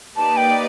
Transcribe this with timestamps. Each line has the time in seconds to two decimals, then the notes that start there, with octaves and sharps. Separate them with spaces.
0.16 A#3 D#4 G4 B4 D5 A5
0.37 G5